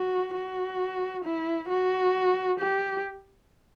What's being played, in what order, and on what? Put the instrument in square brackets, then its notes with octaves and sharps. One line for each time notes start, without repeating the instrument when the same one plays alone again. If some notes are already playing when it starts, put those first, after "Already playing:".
Already playing: [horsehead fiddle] F#4
F#4
E4
F#4
G4